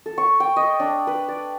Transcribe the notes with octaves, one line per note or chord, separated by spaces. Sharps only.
A4
C#6
G5
D#5
D4
B4
D5